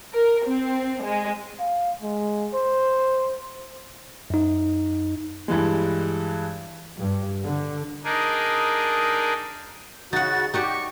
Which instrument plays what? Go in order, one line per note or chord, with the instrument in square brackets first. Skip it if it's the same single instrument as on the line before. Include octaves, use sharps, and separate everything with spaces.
[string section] A#4
C4
G#3
[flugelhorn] F5
G#3
C5
[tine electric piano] F#2 D#4
[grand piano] G2 E3 G#3
[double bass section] G2
D3
[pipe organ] D4 D#4 G#4 A#4
[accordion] C#3 F#4 [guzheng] D#4 F#5 [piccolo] A6
[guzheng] D#4 F#4 D5 [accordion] G4 [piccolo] C#6